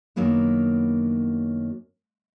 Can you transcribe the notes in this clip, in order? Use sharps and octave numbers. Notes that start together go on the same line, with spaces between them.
F#2 D#3 F#3 A#3 B3 D4